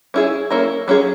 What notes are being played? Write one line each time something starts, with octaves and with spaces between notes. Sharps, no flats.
C#4 E4 G#4
A#3 C#4 E4 A#4
F#3 C#4 G#4